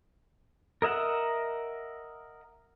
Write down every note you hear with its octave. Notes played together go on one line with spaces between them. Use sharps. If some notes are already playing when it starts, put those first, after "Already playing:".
A#4 D#5 E5 F#5